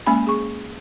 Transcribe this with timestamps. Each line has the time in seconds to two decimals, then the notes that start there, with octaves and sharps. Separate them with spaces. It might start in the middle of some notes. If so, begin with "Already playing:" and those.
0.07 G#3 A#3 C#4 G#5 B5
0.27 G#4 C#6